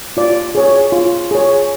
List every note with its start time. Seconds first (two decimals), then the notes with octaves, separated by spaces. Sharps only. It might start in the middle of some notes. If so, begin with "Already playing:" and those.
0.17 F4 D5
0.55 G#4 C#5
0.92 F4
1.31 G#4 C#5